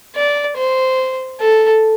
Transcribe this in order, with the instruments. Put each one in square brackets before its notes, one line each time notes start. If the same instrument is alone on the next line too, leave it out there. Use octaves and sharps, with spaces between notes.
[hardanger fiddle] D5
C5
A4